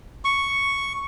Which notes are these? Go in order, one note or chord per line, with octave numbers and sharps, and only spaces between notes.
C#6